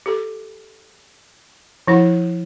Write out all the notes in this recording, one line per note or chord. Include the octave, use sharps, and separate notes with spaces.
G4 A4
F3 E4 F#5